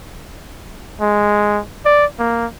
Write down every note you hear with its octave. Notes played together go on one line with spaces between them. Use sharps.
G#3
D5
A#3